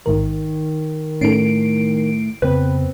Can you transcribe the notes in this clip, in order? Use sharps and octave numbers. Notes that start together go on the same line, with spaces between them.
A1 G#2 D#3 A#4
A2 C#4 D#4 A4 C7 D7
F2 C#3 B3 C4 B4